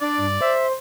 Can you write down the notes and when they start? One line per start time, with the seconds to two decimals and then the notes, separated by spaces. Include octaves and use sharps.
0.01 D4 D5
0.18 G2
0.41 C5 E5